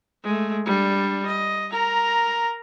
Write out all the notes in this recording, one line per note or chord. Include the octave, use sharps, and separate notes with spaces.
G#3 A3
G3 D4
D#5
A#4 A#5